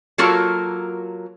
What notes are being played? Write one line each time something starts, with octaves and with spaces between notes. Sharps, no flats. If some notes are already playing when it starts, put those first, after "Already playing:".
F#3 A#3 F4 F#4 A4 A#4